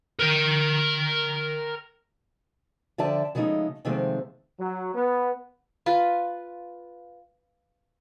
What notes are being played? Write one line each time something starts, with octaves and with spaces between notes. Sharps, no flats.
A#4 G5
D3 F3 D5 E5 G5 A5
C#3 F3 G#3 A3 D#4
C3 D#3 F3 G#3 A3 C4
F#3
B3
F4 B4